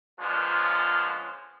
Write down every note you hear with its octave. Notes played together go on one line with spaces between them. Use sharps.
A#2 D3 F3 G#3 B3 C#4